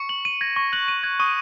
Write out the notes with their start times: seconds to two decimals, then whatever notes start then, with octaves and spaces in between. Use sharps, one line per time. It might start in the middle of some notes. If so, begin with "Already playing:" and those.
Already playing: C#6 C#7
0.09 F#7
0.25 D#7
0.41 G#6 A#6
0.56 C#6 A#6
0.72 F#6 F#7
0.88 D#7
1.03 F#6 G#6
1.20 C#6 D#6 D#7